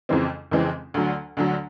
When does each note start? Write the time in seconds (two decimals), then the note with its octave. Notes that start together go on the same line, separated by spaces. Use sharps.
0.09 F2 C#3 E3 G#3 C4
0.51 F2 C#3 E3 G#3 C4
0.94 D2 D3 F#3
1.37 D2 D3 F#3